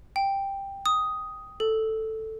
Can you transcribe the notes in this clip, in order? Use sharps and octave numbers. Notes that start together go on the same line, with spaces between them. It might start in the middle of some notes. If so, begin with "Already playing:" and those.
G5
D#6
A4